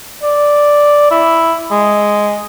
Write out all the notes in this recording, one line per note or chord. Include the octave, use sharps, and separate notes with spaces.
D5
E4
G#3